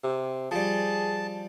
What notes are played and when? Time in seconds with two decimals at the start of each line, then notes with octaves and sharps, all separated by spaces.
0.04 C3
0.51 F3 G3 G#4 A5